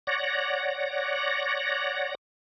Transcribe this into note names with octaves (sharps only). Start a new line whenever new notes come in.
C#5 D5 F#5 A#6